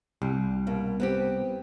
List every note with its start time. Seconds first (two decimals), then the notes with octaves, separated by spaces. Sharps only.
0.22 C2 G3
0.67 B2 A#3
1.00 B3 C4 G4